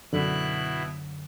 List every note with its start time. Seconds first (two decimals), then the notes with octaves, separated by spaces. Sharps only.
0.13 F#2 B2 D3 E4 F#6